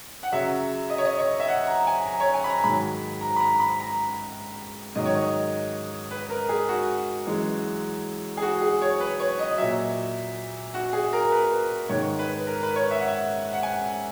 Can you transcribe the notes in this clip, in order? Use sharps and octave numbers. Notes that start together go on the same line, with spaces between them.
F#5
F#2 C#3 F#3 E5
D#5
C#5
D#5
C#5
E5
F#5
A#5
G#5
A#5
C#5
G#5
B5
A#5
G#2 D#3 F#3 B5
A#5
B5
A#5
B5
A#5
G#2 D#3 F#3 D#5
C#5
D#5
B4
A#4
G#4
F#4
F#2 E3 G#3
G#4
F#4
G#4
C#5
B4
C#5
D#5
A#2 F#3 E5
F#4
G#4
A#4
B4
G#2 D#3 G#3 C#5
B4
A#4
B4
C#5
E5
F#5
E5
F#5
G#5